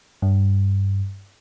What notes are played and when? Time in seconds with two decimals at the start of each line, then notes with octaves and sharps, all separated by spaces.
0.22 G2